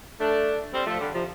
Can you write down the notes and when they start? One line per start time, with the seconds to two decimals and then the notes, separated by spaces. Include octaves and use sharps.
0.20 A3 D4
0.74 G3 C4
0.86 F3 A3
1.00 D3 G3
1.13 C3 F3